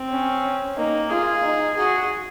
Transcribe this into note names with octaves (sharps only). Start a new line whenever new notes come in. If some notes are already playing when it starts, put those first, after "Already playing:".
Already playing: C4
C#4
A#3 D#4
F4 G#4
D#4
F#4 G#4